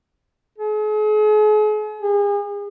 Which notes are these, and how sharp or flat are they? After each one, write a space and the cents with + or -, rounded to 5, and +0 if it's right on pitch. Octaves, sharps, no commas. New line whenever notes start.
G#4 +45
G#4 -40